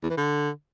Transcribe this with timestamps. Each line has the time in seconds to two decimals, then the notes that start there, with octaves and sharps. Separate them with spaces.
0.03 E2
0.10 E3
0.17 D3